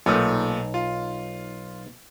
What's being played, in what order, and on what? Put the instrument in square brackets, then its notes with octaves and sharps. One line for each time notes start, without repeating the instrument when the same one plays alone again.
[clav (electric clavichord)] B1 [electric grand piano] A#2 A3
[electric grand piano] F4